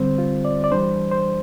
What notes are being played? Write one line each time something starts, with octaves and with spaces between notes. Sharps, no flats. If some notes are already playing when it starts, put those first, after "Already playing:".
Already playing: D3 G3 C4 C5
F4
D5
D5
E3 G3 D4 C5
C5